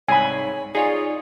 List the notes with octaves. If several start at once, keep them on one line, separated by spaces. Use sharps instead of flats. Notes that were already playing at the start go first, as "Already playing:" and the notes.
C2 G#2 G#4 C#5 G#5 B5
D#4 F4 G#4 C#5 D5